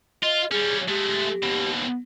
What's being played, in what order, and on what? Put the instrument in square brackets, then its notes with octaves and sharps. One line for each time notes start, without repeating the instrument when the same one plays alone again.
[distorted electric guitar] F4 [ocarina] D#5
[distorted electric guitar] G3 C#4 [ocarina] G#4
[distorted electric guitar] G#3 A3 [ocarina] G4
[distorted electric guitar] D#2 B2